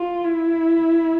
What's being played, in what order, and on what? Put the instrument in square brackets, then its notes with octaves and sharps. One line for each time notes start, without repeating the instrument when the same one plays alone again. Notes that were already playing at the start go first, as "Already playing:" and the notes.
Already playing: [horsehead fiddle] F4
E4